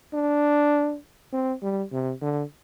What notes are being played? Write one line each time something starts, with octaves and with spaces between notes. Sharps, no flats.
D4
C4
G3
C3
D3